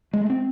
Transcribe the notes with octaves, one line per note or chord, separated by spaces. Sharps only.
G#3
A3
C4